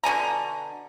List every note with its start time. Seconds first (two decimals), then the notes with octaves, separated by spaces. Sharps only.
0.04 B2 D3 G#5 A#5